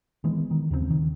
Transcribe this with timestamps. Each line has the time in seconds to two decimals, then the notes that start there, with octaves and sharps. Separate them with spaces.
0.24 D#3 E3 G#3 B3
0.51 D#3
0.71 D#2 C#3 G3 C4
0.90 D#3